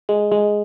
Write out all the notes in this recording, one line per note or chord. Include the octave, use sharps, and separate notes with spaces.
G#3
G#3